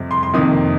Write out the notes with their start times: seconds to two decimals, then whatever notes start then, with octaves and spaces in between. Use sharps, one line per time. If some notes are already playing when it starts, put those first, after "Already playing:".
Already playing: F2 C3 G3
0.11 C6
0.23 C6
0.34 F2 C3 D#3 A#3 D#6